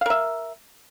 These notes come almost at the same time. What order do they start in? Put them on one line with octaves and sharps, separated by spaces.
F5 A#4 E5